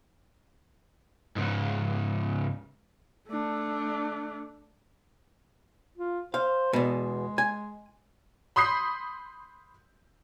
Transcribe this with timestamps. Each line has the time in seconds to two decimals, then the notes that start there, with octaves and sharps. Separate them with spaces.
1.36 C#2 G#2
3.28 A3 D4
5.97 F4
6.34 C5 F5
6.73 E2 B2 G#3
7.38 G#5
8.56 B5 C6 D#6 G6 B6 C7